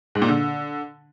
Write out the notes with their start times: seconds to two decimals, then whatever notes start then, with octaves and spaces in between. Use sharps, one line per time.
0.15 G#2
0.22 A#2
0.28 D3